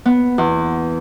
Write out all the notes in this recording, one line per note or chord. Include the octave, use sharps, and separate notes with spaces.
B3
E2